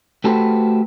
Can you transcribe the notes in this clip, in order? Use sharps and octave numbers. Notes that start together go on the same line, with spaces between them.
A3 F#4 G4 A4 B4 C5